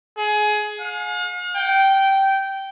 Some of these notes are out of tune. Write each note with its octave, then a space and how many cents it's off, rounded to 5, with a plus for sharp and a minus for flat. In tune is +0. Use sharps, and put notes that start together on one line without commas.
G#4 +20
F5 +45
G5 -15